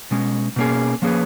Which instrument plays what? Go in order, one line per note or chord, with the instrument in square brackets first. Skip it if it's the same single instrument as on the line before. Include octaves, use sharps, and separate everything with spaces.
[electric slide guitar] B2 G#3 C#4
B2 A#3 C#4 G#4
F3 A#3 C#4 G#4 B4